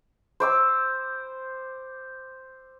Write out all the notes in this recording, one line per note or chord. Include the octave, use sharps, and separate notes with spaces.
C5 D6 E6